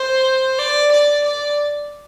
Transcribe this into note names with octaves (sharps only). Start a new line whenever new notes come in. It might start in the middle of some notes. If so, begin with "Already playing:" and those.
Already playing: C5
D5
D5
D5